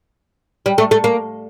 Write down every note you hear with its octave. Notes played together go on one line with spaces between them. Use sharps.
G3
A3
A3
A#3